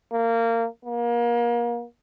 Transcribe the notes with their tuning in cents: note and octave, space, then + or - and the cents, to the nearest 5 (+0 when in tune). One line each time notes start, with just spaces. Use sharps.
A#3 -20
A#3 +30